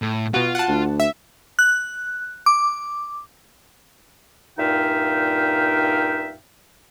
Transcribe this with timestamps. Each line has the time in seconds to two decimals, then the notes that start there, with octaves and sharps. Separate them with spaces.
0.02 A2
0.34 B2 F4 F#4
0.55 F#5 A5
0.68 D2
1.00 E5
1.59 F#6
2.46 D6
4.59 G2 A#2 D#4 E5 F5 G5